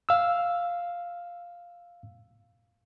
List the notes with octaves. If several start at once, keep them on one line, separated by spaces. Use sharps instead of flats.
F5 E6